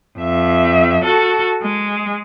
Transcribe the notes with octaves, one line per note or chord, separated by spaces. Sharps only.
F2 E5
F#4 A4
G#3